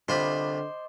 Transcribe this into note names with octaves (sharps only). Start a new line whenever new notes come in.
C2 D3 F4 C5 D#5 B5 D6